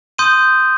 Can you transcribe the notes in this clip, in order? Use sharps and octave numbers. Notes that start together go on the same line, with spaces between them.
C6 D#6 G6 D#7